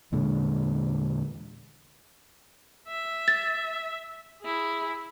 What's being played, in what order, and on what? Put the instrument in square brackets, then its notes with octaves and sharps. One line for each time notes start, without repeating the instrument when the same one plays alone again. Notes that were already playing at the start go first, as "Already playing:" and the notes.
[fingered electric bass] E2 A#2 D3 G#3
[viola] E5
[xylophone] A6
[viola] E4 G#4